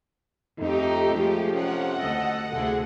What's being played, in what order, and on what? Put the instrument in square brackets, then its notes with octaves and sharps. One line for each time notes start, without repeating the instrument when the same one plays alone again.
[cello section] F2 [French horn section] A3 D#4 [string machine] G4
[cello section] F3 [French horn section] G#3 A3
[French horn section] F2 C3 C#4 [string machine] F#5
[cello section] D2 A4 D#5
[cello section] D2 C3 [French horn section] E4 G#4 A4